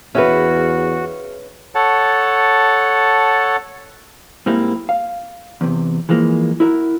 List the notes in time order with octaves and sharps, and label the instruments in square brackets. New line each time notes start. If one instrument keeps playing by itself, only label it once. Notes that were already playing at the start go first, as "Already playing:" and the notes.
[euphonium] E2 [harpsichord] C#3 E5 [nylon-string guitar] C#4 B4 [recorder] F#4
[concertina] A4 C#5 F#5 A5
[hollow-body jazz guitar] G#2 G3 A#3 C4 E4
F5
E2 C3
E3 F3 G#3 A#3
E4 F#4 A#4 E5